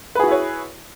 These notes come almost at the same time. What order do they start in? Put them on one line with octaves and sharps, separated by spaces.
B4 G#4 F#4 E4 C#5